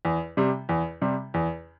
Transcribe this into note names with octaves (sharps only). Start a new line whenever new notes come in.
E2
C3 G3
E2
C3 G3
E2